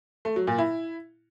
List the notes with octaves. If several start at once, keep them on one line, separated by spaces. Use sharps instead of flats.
A3
F#3
A#2
E4